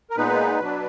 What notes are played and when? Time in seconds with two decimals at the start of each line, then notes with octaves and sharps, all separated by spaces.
0.10 A#4
0.17 A#2 G#3 B3 D#4 B4
0.59 B2 F#3 D4